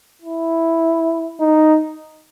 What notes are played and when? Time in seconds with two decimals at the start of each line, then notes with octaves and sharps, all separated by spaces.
0.22 E4
1.40 D#4